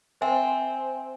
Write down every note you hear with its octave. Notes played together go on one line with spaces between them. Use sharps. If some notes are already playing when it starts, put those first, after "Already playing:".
C4 C5 E5 G#5